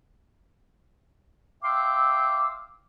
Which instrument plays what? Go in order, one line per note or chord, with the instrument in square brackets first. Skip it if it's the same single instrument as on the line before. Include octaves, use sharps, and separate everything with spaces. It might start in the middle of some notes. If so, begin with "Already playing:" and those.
[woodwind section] E5 F5 G5 C6 D6 E6